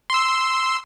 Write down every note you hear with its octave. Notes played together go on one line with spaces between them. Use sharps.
C6 E6